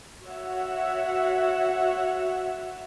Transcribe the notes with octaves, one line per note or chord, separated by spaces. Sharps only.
F#4 C#5 E5 F#5